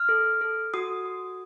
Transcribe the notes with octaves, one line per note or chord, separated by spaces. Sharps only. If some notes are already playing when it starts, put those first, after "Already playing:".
Already playing: F6
A4
A4
F#4 D#6
F#4